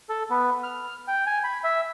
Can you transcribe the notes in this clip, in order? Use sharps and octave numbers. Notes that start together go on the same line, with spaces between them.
A4
B3
F6
G5
G#5
B5
E5